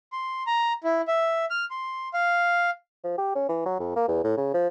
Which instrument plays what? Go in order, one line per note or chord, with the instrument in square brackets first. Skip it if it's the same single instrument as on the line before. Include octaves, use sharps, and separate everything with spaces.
[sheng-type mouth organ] C6
A#5
E4
E5
F6
C6
F5
[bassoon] F3
G4
C#4
E3
F#3
F2
A#3
E2
A2
C#3
F3